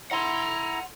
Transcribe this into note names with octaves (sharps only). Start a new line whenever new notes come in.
E4 F#5 A#5 C6